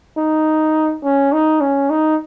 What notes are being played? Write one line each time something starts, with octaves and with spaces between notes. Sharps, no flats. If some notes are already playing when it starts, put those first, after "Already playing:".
D#4
C#4
D#4
C#4
D#4